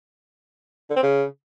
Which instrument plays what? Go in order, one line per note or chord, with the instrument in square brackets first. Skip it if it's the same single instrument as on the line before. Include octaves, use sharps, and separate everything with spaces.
[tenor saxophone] D3
C4
C#3